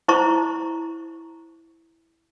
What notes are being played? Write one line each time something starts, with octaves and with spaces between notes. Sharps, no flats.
E4 C5 A#5 C#6